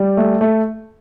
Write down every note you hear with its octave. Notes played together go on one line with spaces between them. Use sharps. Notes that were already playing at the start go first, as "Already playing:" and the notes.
Already playing: G3
A3
A3